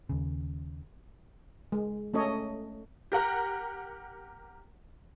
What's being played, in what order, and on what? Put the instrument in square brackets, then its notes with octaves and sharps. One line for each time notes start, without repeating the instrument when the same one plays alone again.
[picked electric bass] D#2 C#3
[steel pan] G#3
A3 C#4 A4 C#5 D#5
[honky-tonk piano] G4 A#4 F#5 A#5